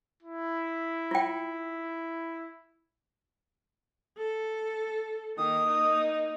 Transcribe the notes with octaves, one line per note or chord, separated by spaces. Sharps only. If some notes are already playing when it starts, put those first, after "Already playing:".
E4
F4 G5
A4
D#3 A#3 D#6
D#4